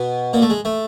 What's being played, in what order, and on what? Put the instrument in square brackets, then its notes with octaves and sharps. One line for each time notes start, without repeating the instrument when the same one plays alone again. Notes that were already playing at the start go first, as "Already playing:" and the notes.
Already playing: [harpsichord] B2 B3
A#2 A#3
A3
G#3
A3